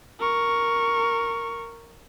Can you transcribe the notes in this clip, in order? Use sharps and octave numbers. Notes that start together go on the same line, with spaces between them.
A#4 C#6